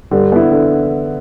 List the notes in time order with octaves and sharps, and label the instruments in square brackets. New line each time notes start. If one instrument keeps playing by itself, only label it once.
[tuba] G2 [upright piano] D3
[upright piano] B3 E4
D3